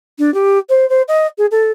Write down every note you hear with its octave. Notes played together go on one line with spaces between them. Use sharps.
D4
G4
C5
C5
D#5
G#4
A4